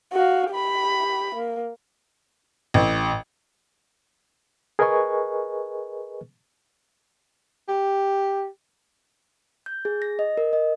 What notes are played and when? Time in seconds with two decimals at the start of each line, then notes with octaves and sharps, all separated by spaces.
0.13 F#4 F5
0.51 G4 B5
1.35 A#3
2.74 A1
4.79 G#4 A#4 B4 D#5 G#5 C#6
7.68 G4
9.66 G6
9.85 G#4
10.02 A#6
10.19 D#5
10.37 A#4
10.53 D#5